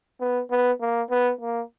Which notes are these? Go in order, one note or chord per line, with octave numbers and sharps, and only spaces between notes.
B3
B3
A#3
B3
A#3